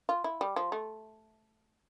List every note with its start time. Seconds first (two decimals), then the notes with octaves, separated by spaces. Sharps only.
0.09 F4
0.24 E4
0.41 G3
0.56 F3
0.72 A3